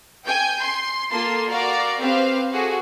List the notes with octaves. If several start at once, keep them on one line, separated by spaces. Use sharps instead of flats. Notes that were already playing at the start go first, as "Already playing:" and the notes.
G5 G#5 G6
C6
A#3 F4 A4 A5 C6
F#4 A#4 D5 F5
C4 G4 B4 F5
F#4 G#4 A4